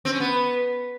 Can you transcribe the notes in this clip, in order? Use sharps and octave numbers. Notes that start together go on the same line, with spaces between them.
C4
C#4
B3